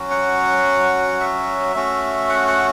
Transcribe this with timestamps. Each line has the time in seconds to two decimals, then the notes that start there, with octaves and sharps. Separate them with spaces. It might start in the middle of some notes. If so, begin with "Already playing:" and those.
Already playing: F#3 C#4 F#4
0.10 F#5
1.20 E5
1.75 A3 C#4 F#4
2.29 F#5
2.48 F#5